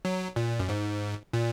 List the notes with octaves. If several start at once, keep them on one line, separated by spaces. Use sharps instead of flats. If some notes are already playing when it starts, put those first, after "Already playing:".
F#3
A#2
F#2
G#2
A#2